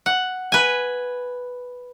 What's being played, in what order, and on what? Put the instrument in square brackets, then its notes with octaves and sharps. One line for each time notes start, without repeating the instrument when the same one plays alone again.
[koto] F#5
B4 G#5